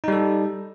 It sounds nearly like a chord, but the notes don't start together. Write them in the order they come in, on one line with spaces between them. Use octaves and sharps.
D#4 G3 A4